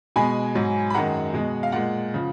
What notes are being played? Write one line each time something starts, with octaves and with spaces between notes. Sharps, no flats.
B2 G#3 G#5 B5
G#2 F#3
B5
F#2 D#3 G#3 F#5 A#5
B2 G#3
F5
A#2 G#3 F#5
C#3 F3